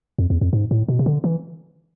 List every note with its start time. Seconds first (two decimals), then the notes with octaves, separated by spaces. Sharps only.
0.19 F2
0.30 E2
0.41 F2
0.53 G#2
0.71 A2
0.88 B2
0.99 C3
1.06 D3
1.24 E3